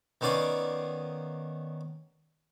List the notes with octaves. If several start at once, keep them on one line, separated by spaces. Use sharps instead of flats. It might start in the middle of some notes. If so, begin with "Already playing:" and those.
D#3 B3 C#4 D5 F5 D#6